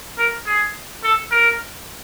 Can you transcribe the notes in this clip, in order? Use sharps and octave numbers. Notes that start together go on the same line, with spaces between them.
A#4
G#4
A4
A#4